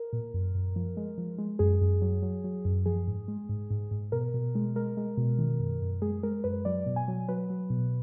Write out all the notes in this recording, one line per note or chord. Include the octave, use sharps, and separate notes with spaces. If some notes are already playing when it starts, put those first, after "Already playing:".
Already playing: A#4
A#2
F#2
F#2
F3
G#3
F3
G#3
F#2 G#4
F#2
F#3
F#3
F#3
F#2
F3 G#4
G#2
G#3
G#2
G#2
G#2
B2 A#4
B2
G#3
G#3 A#4
G#3
B2
D#3
F#2
F#2
G#3 G#4
G#3 A#4
F#2 B4
F#3 D5
B2
G#5
F#3
F#3 B4
F#3
B2